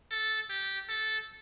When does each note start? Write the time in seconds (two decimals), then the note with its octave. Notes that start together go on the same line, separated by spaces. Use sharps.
0.11 A4
0.50 G4
0.89 A4